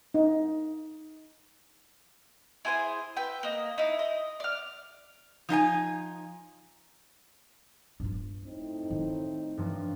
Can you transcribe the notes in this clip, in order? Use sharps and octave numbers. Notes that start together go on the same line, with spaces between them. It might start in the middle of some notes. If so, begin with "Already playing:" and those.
D#4
E4 G#4 C5 G#5
B4 E5 G5
A#3 D#5
D#4 E4
D#5
D5 F6
F3 D#4 F5 G#5
G2 F4
A2 C4 D#4
D#3
G2 F3 F#3